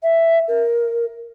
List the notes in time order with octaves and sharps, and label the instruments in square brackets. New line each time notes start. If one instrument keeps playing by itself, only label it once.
[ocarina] E5
A#4